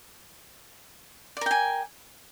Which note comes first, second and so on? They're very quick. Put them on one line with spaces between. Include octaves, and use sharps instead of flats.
D5 A#4 G5 G#5